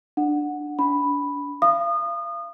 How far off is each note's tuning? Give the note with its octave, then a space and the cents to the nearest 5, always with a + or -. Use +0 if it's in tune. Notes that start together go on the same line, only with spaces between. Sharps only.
D4 +20 F#5 -10
D4 -35 B5 +0
F5 -35 D#6 -30